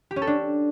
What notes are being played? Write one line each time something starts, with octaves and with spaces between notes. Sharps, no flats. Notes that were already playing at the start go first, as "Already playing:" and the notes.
G4
C#4
A4
D4